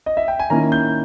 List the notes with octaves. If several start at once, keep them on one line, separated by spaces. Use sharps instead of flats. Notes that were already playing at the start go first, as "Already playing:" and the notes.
D#5
E5
G5
G#5
D#3 A#3 C#4 E4 A#5
G6